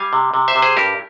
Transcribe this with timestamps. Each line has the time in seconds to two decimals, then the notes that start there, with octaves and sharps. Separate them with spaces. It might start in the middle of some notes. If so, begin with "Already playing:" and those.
Already playing: G3 F5 G#5
0.13 C3
0.34 C3
0.48 C5 E5
0.55 C3
0.62 G#4 C5
0.77 G2 G4 A#4